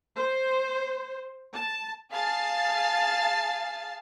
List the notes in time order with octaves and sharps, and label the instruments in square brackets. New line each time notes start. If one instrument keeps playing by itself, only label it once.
[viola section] C5
A5
[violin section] G#4 F5 A5 A6 C7